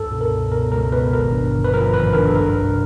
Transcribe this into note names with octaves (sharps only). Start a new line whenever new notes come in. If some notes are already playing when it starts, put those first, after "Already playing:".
Already playing: C#2 G2 A4
B2
A#4
C#2
B2 A#4
C#2 A#4
B2 B4
G#1 A#4
G2
D3
B4
F3 A#4
G#1 B4
G2 A#4
A4
C2 A#4
C3